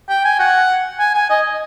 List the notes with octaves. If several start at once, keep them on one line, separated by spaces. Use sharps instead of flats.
G5
G#5
F#5
G#5
G#5
D#5